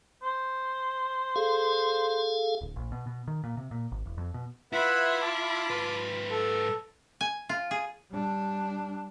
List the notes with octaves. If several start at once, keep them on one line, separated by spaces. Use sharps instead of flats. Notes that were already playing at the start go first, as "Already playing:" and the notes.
C5
G#4 A4 F5
D1
A#1
B2
B2
D#3
A#2
C3
A#2
G#1
E1
F2
B2
E4 F4 B4 E5 F#5 B5
A5 D6
G#2 B4
A4
G#5
F4
G#4
G3 D4